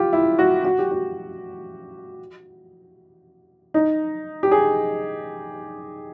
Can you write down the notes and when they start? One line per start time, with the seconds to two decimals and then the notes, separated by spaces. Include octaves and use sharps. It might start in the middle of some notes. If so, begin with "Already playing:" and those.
Already playing: F4 G4
0.13 E4
0.39 F#4
0.65 F#4
0.79 G4
0.91 F#4
3.74 D#4
4.43 G4
4.51 G#4